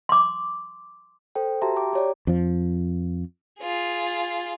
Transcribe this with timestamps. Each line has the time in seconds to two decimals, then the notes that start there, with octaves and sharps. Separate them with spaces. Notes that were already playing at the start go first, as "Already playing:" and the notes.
0.09 C6 D6
1.35 A4 C5 G5
1.62 F#4 G4 E5 A5 A#5 C6
1.76 G5 A#5 D6
1.93 G4 C#5 D5
2.27 F2 F3
3.61 F4 G#4